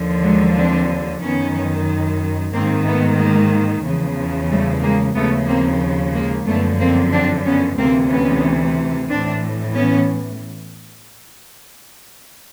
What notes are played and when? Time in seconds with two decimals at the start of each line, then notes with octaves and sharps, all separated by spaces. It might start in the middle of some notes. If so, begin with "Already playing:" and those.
Already playing: D#2 D3 F3
0.23 F#3 G#3
0.56 C4 D4
1.21 F#2 D#3 B3 C#4
2.53 G#2 D#3 A#3 C4
2.85 A3 B3
3.18 G#3 A#3
3.84 E2 C#3 F3
4.51 G3 A3
4.82 G#3 A#3
5.15 D#2 C#3 F3 A3 B3
5.48 A#3 C4
6.14 G#3 A#3
6.46 F#2 D3 F3 A3 B3
6.80 A#3 C4
7.12 C4 D4
7.45 B3 C#4
7.78 D2 C3 E3 A#3 C4
8.10 B3 C#4
9.09 A2 E3 C4 D4
9.75 B3 C#4